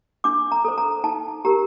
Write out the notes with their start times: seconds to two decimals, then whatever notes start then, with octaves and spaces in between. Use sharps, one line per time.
0.24 D4 D6
0.52 A#5
0.65 A4 C5
0.78 A#5
1.04 D#4 A5
1.45 G4 A#4 A#5